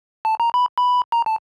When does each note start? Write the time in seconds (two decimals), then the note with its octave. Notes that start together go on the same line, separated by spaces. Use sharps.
0.25 A5
0.40 A#5
0.54 B5
0.78 B5
1.12 A#5
1.26 A5